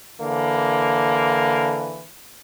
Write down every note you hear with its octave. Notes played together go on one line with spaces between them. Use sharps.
D3 E3 A#3